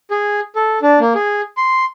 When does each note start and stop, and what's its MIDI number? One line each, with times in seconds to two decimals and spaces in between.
0.11 0.40 68
0.55 0.79 69
0.82 0.99 62
1.00 1.13 58
1.15 1.41 68
1.57 1.85 84